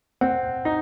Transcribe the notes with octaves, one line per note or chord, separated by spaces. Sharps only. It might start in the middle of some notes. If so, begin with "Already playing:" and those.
C4 F#5
D#4